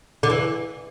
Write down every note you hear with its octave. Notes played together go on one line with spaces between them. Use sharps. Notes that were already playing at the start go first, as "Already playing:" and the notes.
D3
E3